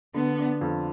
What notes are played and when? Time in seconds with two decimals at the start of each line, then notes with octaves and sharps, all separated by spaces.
0.14 D3 B3
0.38 D4
0.61 F2